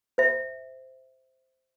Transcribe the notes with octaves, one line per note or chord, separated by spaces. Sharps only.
C5 E5